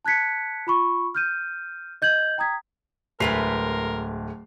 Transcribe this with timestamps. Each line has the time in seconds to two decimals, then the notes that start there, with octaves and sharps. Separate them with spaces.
0.05 A5 F#6 G#6 B6 C#7
0.67 F4 B5 C#6
1.15 F6 G6 D#7
2.02 D#5 G6 G#6 F#7
2.38 G5 A#5 D#6 G#6 B6
3.20 D1 G#3 A3 A#4 B4 C7 F7